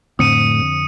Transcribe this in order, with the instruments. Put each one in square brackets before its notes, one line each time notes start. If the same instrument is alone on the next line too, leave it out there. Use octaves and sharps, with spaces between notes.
[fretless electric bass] F2 D3 C4 [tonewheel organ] A2 [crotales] D#6 C#7 D#7